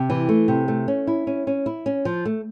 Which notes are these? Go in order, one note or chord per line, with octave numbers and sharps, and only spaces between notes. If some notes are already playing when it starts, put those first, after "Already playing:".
Already playing: C3
E3
A3
C3
A3
C#4
E4
C#4
C#4
E4
C#4
F3
A3